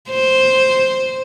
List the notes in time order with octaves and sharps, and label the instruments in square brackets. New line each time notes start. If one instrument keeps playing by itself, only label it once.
[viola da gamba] C5